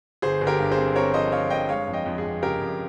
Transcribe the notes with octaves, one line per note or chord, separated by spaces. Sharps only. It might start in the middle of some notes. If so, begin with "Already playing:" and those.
G1 G#4 C5
G1
G4 A#4
G2
G#4 C5
C4
C4 A#4 C#5
F3 C5 D#5
F3 C#5 F5
G2 D#5 G5
G#3 C#5 F5
F2
D#5 G5
F2
G#4
F2
C#3 G4 A#4
F2